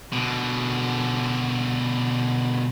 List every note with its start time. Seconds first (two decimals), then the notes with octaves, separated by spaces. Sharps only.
0.13 B2 D3